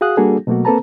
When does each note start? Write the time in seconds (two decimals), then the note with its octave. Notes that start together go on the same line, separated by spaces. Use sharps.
0.01 F#4 G#4 F5 D#6 F#6
0.17 G3 A#3 D4 F#4 G#4 A4
0.47 B2 F#3 A3 A#3 F#4
0.65 A#3 C4 A4 B4 A5 A#5